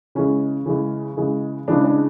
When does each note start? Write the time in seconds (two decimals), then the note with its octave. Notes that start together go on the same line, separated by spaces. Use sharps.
0.15 C#3 E3 G#3 C#4
0.66 C#3 E3 G#3
1.17 C#3 E3 G#3
1.68 C#3 E3 G#3 D4
1.84 D4